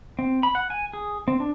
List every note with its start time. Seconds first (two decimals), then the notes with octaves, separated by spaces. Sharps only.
0.19 C4
0.43 B5
0.55 F#5
0.70 G#5
0.93 G#4
1.28 C4
1.40 D4